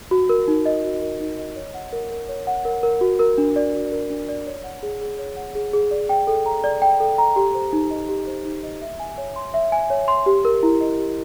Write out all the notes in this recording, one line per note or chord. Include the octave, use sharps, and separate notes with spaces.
F#4
A#4
D#4
D#5
F#4
A#4
D#4
D#5
C#5
F#5
A#4
A#4
C#5
F#5
A#4
A#4
F#4
A#4
D4
D5
F#4
A#4
D4
D5
C#5
F#5
G#4
G#4
C#5
F#5
G#4
G#4
D5
G5
A4
A#5
D5
G5
A4
A#5
G4
C5
D#4
D#5
G4
C5
D#4
D#5
E5
G#5
C#5
C6
E5
G#5
C#5
C6
G4
A#4
E4
D#5
G4